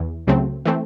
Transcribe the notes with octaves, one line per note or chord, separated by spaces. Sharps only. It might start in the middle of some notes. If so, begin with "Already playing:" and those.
Already playing: E2 E3
C#2 C#3 F#3 A3 C4
E3 A3 C4